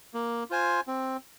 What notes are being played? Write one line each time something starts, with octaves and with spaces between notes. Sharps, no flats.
A#3
F4 C5 G#5
C4